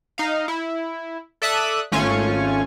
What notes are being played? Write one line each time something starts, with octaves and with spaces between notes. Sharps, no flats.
D#4 F5
E4
A4 D5 E5 D#6 F#6
G#1 A3 C#4 F4 G#5 C#6